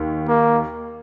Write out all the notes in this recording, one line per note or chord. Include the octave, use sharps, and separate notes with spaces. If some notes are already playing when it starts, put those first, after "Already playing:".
Already playing: D#2 D#3
A#3